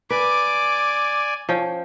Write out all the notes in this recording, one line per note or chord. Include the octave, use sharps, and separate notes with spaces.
B4 D5 G#5 D6
F3 C#4 G5